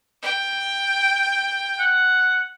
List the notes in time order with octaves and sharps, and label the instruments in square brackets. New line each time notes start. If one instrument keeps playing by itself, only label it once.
[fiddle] G5
[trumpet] F#5